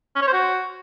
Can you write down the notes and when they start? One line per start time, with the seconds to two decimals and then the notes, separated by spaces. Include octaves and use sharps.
0.16 C#4
0.21 C#5
0.27 C5
0.33 F#4